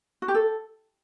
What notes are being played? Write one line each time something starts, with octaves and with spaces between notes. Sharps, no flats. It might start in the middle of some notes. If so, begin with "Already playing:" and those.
F#4
G4
A4